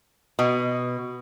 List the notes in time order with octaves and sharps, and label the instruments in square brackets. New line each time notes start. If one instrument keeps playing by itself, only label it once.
[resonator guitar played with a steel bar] B2